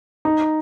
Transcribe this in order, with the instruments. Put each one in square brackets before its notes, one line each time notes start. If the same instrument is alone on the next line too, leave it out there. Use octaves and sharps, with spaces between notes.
[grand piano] D#4